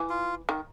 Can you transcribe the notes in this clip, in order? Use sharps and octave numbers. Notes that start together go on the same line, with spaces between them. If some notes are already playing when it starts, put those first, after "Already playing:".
Already playing: E3
F4
D#3